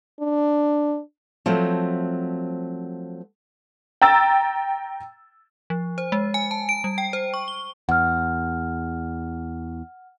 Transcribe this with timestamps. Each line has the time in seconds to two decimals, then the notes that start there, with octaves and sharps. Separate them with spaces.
0.20 D4
1.46 F3 F#3 A3 C4
4.02 G5 A#5 E6 A6
5.70 F3
5.98 C5
6.12 G#3
6.34 G#5
6.51 A5
6.69 D7
6.84 G3
6.98 G5
7.13 C5
7.34 C#6
7.48 G7
7.89 E2 F#5 F6